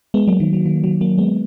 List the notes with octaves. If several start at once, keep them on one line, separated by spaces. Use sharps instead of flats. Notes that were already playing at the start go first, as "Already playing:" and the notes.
G#3 B3
F#3 A#3
D#3 F#3
D#3 F#3
D#3
D#3 F#3
F#3 A#3
G#3 B3